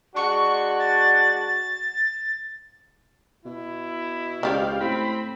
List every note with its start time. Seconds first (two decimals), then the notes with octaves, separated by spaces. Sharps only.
0.16 G#3 D4 F#4 C#6
0.79 A6
3.45 B2 E4
4.43 C#2 G4 C5 D5 D#5 F5
4.81 A2 C4 B5